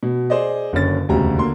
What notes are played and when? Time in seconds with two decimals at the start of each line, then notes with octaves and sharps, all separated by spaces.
0.03 B2
0.30 G#4 C5 D5 D#5
0.73 F#1 D3 C#4 A6
1.09 E1 D2 C#3 F#4 G4 A#5
1.38 D3 A#3 C6